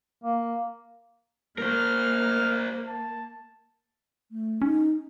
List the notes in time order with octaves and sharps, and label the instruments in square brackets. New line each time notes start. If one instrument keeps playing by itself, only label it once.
[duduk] A#3
[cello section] A#3 [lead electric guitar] A#4 C5 [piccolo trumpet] F6
[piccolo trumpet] A5
[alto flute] A3
[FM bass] C#4 [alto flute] D#4